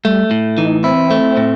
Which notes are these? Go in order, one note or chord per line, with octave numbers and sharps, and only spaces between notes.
G3 A3
A2
E3 D#4
C4 E4
A3
A2